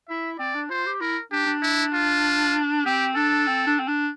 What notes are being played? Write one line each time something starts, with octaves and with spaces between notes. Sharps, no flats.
E4 E5
C4 D5
D4
F4 C5
G4
E4 A#4
D4 G4
D4
E4
F4
C4 G4
D4 A4
C4
D4
C4
D4